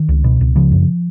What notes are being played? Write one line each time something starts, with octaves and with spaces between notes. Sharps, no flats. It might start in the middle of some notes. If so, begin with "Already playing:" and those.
Already playing: D#3
C#2
B2
C#2
C#3 F3
F#2